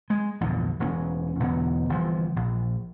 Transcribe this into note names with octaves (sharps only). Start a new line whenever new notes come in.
G#3
A#1 E2 G2 D3
E1 C4 C#4
E2 B2 D3 F#3
G1 E3 F3
A#1